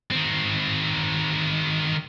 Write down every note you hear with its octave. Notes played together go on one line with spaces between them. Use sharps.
D#3 C4